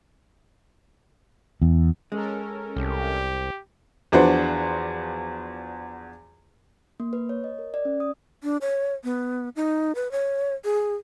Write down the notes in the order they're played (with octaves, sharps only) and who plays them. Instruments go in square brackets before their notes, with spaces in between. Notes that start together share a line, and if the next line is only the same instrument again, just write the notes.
[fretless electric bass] E2
[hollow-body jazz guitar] G#3 [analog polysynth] C#4 A4 A#4
[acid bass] C2 [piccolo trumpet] G4
[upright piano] E2 F3 D4 F#4 B4 C5
[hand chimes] A#3
B4
C#5
D#5
A#4
D5
C#4
D#6
[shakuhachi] D4
C#5
B3
D#4
B4
C#5
G#4